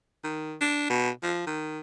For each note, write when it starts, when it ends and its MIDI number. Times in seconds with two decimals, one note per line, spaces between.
0.24 0.55 51
0.61 0.88 62
0.90 1.10 47
1.23 1.46 53
1.47 1.80 51